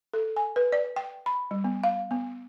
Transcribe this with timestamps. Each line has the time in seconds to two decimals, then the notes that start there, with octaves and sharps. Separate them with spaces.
0.14 A4
0.36 G#5
0.56 B4
0.72 D5
0.96 G5
1.26 B5
1.51 G3
1.64 B3
1.84 F5
2.11 B3